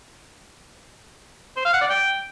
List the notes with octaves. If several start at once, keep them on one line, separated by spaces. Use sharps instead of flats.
C5
F5
F#5
D5
G5